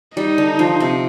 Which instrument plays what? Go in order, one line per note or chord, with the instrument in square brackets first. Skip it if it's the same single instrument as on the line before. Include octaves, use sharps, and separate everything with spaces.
[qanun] G3 [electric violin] D#4
[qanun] D3
F3
C3